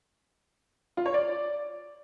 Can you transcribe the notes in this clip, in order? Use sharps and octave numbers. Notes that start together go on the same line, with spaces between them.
F4
C#5
D5